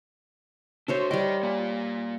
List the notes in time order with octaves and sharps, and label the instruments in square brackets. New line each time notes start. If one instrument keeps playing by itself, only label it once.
[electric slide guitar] D4 F#4 [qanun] C5 C#5 E5
[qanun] G3 G5 [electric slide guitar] A#4 D#5
[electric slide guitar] A#3 D5